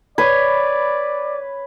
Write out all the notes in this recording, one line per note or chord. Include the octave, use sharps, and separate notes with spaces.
B4 C#5 D5 G#6